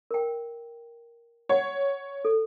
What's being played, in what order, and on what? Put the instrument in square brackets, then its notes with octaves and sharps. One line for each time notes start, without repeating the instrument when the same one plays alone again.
[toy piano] A#4 G5
[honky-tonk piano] C#5 [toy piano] F#5
[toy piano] A4